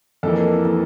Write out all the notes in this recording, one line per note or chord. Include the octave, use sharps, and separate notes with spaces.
F2 E3 A#3 A4
E3 A#3